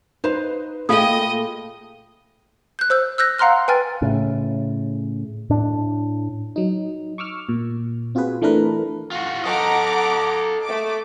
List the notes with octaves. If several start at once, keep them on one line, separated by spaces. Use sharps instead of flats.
D#4 B4 C5 F5
A#2 A3 G#4 D#5 F5 G5 B5 D#6
F#6 G6
C5 E6 G6
E6 F#6 G6 A#6
F5 F#5 A#5 C6 F6 F#6
B4 G5 G#5 F6 A6
A2 C#3
A2 D4
F#3 D#4
C#6 D6 E6 F6
A#2
C4 F4 F#4 G#4 B4
E3 A3 D4 A#4 B4
F4 F#4
A4 D#5 F#5 A#5 D6
A3 D6